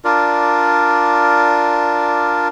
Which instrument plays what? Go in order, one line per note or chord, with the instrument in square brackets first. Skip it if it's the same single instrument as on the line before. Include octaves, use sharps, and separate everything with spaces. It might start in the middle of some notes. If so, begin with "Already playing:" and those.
[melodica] D4 F4 A#4 D5